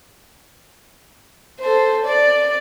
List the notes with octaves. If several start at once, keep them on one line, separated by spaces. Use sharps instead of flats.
A4 C5
D5